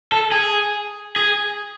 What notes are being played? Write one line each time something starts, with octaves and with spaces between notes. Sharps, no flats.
A4
G#4
G#4